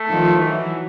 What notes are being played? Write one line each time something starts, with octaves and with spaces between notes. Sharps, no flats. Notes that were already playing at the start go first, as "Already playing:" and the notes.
Already playing: A3
D#3 F3
E3 F#3